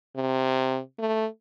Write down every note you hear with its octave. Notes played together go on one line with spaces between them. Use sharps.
C3
A3